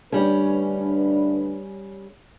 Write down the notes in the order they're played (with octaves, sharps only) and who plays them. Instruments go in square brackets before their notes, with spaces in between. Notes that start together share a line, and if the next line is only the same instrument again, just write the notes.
[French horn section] D2 D4 B4 [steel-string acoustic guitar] G3 C#4